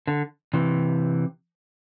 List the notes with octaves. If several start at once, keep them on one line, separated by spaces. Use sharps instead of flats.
D3
C3 E3